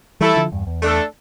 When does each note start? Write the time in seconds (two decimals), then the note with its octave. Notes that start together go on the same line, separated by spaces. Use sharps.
0.20 E3 G3 A3 E4 A4
0.36 D3 F3
0.52 E2 G2
0.67 E2
0.82 A3 D4 A4